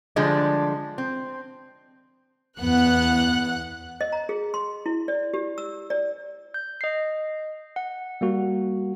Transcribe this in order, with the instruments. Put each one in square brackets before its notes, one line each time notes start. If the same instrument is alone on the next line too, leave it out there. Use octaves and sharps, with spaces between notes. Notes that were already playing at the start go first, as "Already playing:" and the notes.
[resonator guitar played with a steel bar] D3 F3 G3 G#3 D4
C4
[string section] E2 F#5 F#6 [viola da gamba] B3
[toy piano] D#5
A#5
G#4
C6
E4
D5
G4
E6
D5
[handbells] G6
D#5 C7
F#5
[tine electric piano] G3 A#3 F#4